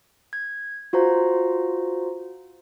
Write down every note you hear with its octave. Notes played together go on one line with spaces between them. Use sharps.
G#6
F4 F#4 C5 A#5